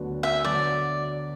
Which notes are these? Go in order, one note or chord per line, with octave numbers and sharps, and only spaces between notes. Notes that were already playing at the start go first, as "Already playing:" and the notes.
Already playing: D2 D3 F#3 B3 F#4
E5
D3 F#3 B3 D5